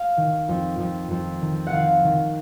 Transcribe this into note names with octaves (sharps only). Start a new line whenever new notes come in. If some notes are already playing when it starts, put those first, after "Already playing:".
Already playing: F5
D#3
F2
F2
F2
D#3
F#5
D#3 F5
D#3